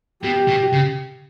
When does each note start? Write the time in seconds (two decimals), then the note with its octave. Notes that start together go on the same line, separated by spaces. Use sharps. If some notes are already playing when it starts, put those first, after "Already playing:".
0.23 B2 G4
0.47 B2
0.73 C#3